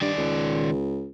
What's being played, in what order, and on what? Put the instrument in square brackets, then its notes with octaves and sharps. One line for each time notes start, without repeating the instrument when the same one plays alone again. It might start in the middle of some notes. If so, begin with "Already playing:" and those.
[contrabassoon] G2 [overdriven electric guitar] D#3 D5
[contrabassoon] C#2